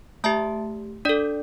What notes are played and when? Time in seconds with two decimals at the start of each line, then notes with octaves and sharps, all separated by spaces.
0.24 A3 G4 E5 A5
1.05 D4 A4 D5